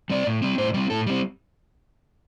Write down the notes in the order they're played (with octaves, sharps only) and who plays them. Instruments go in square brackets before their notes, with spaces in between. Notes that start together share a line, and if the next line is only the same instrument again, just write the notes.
[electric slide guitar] G3 C4 D5
A2
G3 C4
A2 C5
G3 C4
A2 A4
G3 C4